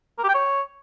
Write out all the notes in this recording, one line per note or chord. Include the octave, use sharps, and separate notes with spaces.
A#4
G4
G5
C#5